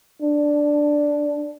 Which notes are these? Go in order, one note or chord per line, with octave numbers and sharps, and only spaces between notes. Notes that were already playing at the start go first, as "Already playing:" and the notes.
D4